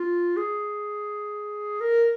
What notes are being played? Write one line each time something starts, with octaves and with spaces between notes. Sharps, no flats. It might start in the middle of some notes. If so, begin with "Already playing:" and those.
Already playing: F4
G#4
A#4